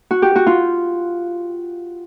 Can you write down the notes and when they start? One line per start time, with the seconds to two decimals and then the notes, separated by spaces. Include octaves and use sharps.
0.11 F#4
0.22 G4
0.36 F#4
0.46 F4